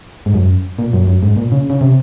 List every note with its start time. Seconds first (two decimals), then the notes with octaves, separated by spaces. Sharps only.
0.26 G#2
0.34 F#2
0.79 A#2
0.93 F#2
1.07 F#2
1.23 G#2
1.37 A#2
1.52 C#3
1.70 C#3
1.81 C3